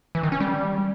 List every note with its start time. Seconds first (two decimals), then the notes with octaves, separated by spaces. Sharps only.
0.15 E3
0.23 D#3
0.32 C#4
0.40 G3